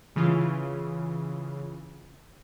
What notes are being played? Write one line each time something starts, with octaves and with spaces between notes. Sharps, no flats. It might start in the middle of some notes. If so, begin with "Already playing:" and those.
C#3 E3 F4